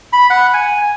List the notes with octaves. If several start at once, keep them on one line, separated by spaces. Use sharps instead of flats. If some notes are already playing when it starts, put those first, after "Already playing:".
B5
F#5
G#5